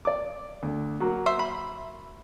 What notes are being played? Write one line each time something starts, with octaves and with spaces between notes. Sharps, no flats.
D5 D6
D2
F#3 A#3 F#4
C5 E5
B5